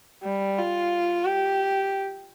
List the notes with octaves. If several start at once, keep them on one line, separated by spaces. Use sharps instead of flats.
G3
F4
G4